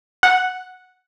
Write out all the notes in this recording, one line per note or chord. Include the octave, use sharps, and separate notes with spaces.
F#5